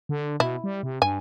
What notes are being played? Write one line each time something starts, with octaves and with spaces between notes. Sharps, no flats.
D3
B2 E4
G3
C3
G2 G#5